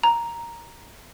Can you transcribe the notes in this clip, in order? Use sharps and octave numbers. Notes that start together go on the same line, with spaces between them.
A#5